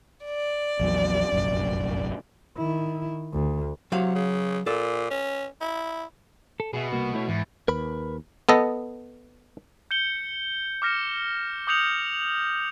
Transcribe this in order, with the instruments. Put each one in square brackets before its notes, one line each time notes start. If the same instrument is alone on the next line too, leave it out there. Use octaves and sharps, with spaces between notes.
[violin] D5
[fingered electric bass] A#1 E2 F#3
F1 A#1 F#2
[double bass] D#3 E4
D2
[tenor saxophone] C3 [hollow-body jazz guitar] F#3 F5
[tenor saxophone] C#3
[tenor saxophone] A#2 [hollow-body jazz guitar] A4
[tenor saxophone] C#4
E4
[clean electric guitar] A4
[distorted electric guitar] B2 [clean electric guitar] G#4 E5
[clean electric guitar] C2 A#3 F#4
A3 E4 C#5
[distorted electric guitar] E2 [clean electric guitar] G#2
[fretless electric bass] D#2 [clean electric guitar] A#4 B4 B5
[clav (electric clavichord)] B3 A4 D#5
[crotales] G6 C#7 G7
D6 F6 A#6 C#7 E7
D6 D#6 G6 C#7 F7 F#7